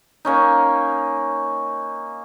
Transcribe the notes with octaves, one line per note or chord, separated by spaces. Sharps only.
A#3 C#4 D#4